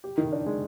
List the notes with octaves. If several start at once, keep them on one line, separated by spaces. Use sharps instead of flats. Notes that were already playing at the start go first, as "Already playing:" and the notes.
G4
D#3
D4
G#3